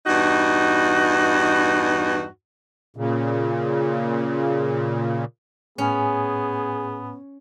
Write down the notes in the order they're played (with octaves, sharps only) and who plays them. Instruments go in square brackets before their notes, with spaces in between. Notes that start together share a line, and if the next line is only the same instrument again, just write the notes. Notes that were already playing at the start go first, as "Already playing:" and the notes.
[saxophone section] E2 G2 D#4 F#4
[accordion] A#2 C#3
[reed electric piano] A2 G#5 [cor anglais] B3 [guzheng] C#4 [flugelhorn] G#4